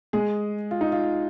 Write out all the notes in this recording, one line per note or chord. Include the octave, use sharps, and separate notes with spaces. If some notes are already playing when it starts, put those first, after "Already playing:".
G#3 G#4
F4
D#4
F4